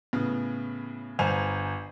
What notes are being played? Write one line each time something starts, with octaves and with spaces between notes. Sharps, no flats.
A2 C#3 B3
G1 C5 G#5 F7